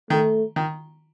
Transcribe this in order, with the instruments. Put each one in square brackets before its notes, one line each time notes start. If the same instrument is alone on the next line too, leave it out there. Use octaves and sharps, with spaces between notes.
[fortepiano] D#3 [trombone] A3
[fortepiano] D#3